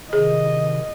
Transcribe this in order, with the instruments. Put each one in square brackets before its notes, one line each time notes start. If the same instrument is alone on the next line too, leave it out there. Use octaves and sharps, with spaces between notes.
[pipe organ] C3 D#3 [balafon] G#4 [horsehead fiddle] D#5